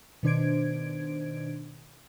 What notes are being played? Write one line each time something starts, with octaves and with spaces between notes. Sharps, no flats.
B2 D#3 D4 C5 G#6 D7